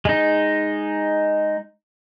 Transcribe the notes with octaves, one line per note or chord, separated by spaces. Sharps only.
G#3 D#4